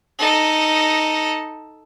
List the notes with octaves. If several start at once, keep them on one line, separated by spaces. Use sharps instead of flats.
D#4 A4